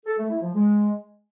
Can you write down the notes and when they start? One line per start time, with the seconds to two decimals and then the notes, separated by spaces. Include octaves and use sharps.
0.06 A4
0.18 A3
0.30 E4
0.42 F3
0.54 G#3